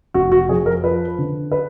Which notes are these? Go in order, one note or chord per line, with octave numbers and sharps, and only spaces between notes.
F1 F#4
F#4
F2 G#4
A#4
F3 B4
D3
B4